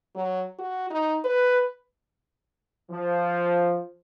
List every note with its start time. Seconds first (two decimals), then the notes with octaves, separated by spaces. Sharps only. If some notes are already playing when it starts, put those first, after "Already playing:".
0.15 F#3
0.59 F#4
0.91 D#4
1.24 B4
2.90 F3